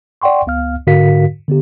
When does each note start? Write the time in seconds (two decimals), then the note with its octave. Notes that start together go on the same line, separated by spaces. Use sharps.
0.22 D5 F#5 G5 C6 C#6
0.46 C#2 B3 F5 F6
0.87 G#2 D3 F#4 A#4 F5 B6
1.48 D3 B3 G4